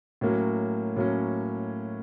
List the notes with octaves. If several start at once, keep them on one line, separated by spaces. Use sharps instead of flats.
A2 F#3 A#3 C#4
A2 F#3 A#3 C#4